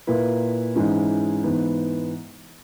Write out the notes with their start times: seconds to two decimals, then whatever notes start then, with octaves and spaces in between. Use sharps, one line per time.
0.07 A#2 A#3 E4 B4
0.75 G#2 E3 G#3 C#4 E4
1.44 G#2 E3 B3